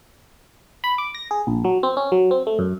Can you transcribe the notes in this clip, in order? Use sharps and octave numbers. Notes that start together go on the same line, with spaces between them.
B5
D6
A#6
G#4
A#1
F#3
C4
C#4
F#3
C4
A3
F#2